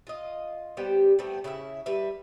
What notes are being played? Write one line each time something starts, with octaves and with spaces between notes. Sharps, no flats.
F4 D#5
G3 B3 G4 C5
G3 A3 B3 C4
C#3 E4 B4 E5
G3 B4 E5